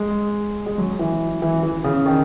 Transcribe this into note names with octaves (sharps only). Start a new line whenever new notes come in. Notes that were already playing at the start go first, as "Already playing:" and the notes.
Already playing: G#3
G#3
F#3
E3
E3
E3
C#3
D#3